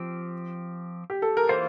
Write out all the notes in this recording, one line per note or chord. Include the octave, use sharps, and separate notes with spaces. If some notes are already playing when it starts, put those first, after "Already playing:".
Already playing: F3 C4 G4
G4
A4
A#4
E3 A#3 F4 C5